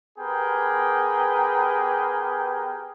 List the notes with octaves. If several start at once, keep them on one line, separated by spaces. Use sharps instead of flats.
B3 G4 G#4 A#4 B4 G5